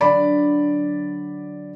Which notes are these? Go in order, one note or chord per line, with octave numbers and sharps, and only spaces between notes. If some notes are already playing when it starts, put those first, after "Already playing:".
D3 F#3 D4 D5 B5